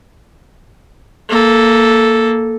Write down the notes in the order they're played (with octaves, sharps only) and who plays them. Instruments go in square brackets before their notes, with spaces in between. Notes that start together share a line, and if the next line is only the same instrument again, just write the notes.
[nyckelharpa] A#3 A4